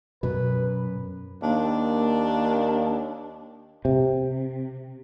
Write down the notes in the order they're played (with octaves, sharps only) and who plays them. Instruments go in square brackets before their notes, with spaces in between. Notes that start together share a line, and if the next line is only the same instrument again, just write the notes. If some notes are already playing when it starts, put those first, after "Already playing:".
[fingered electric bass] F#2 [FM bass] B2 [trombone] B4
[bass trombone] D#2 [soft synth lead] A#3 [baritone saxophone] D4
[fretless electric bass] C3